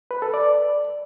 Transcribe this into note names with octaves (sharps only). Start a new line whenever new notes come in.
B4
A4
D5